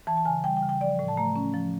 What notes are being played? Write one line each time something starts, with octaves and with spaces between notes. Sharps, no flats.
E3 A5
A5
C#3 G#5
G3 G5
G5
C#3
G5
F3 D5
A2
A5
A3 A#5
C#4
F3